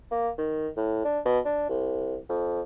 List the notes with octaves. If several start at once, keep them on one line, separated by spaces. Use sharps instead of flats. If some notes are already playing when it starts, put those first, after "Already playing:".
A#3
D#3
A2
D4
B2
D4
C2
F2